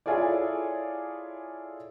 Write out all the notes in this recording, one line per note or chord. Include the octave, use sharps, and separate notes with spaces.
E4 F4 G#4 A4 C#5 D5